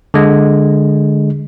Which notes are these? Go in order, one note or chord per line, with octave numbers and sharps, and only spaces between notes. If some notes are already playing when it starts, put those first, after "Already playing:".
D3 G#3